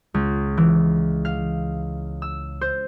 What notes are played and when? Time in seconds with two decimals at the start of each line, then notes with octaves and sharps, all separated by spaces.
0.14 C#2
0.57 E3
1.25 F5
2.22 E6
2.61 C5